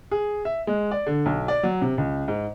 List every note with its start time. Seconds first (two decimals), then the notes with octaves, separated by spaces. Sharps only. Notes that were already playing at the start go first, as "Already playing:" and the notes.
0.11 G#4
0.45 E5
0.67 G#3
0.91 D5
1.06 D3
1.26 B1
1.48 D5
1.63 F#3
1.82 C3
1.98 C#2
2.28 G#2